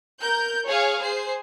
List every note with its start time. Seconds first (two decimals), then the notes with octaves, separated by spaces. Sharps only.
0.21 A#4 G6
0.67 G#4 C#5 F5 G#5
1.01 G#4 C5 C7